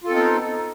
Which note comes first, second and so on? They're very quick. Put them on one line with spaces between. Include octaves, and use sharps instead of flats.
F4 A4 C4 D#4 B3